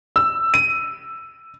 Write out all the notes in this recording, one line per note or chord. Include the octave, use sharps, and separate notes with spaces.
E6
D#7